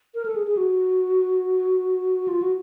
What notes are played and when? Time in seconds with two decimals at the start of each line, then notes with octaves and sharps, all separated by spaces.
0.15 A#4
0.25 A4
0.36 G#4
0.47 G#4
0.57 F#4
2.28 F4
2.42 F#4